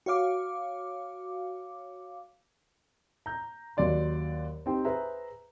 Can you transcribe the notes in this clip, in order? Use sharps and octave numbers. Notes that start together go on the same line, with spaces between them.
F#4 C#5 F5 D6
A#5 G6
D#2 F#3 D5 C6
C4 D#4 G4 C5 G5
G#4 B4 C5 E5 A#5